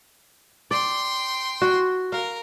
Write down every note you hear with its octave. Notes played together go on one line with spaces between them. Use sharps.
D5 G5 C6
F#4
A#4 F5